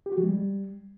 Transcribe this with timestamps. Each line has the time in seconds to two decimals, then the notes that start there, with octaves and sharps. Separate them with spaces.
0.06 G4
0.12 F#4
0.18 F3
0.23 G#3
0.29 G3